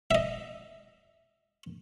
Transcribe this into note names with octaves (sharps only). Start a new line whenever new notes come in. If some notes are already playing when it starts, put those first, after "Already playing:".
D#5 E5